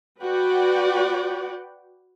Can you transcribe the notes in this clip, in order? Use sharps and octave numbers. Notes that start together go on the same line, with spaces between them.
F#4 B4 D5 F#5 G5